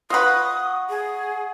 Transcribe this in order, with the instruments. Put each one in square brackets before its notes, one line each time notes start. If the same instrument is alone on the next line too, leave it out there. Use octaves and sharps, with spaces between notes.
[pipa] F4 B4 [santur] D#5 F#5 C#6 [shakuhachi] D#6
[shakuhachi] G#4